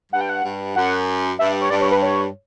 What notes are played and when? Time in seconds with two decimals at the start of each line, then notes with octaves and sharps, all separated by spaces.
0.12 G2 F#5
0.21 G5
0.29 F#5
0.44 G2
0.76 F#2 F#5
1.39 G2 E5
1.61 C#5
1.70 G2 D5
1.81 C#5
1.91 B4
2.02 C#5